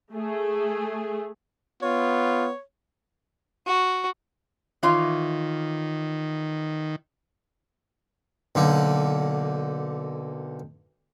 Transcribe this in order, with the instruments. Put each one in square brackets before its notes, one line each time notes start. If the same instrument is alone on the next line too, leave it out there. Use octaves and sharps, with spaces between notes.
[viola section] A3 G#4
[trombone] B3 [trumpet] F4 [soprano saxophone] C#5
[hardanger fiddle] F#4
[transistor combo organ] D#3 [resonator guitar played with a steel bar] E3 F4 C#5
[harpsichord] B1 D3 A#3